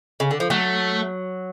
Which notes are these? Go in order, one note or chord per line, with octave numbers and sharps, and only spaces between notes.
C#3
D3
F3
F#3 A3